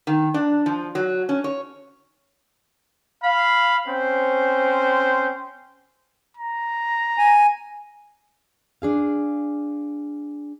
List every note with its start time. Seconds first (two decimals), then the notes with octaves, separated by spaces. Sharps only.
0.07 D#3
0.34 D4
0.66 F3
0.95 F#3
1.29 C#4
1.44 C#5
3.23 F5 B5
3.88 C4 C#4 C5
6.37 A#5
7.18 G#5
8.82 D4 G#4 F5